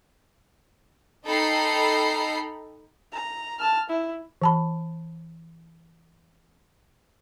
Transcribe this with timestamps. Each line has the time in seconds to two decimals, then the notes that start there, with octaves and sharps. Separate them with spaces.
1.25 D#4 A4 G5 A#5 B5 C7
3.12 A#5
3.59 A5 F6
3.89 E4
4.42 E3 A5 B5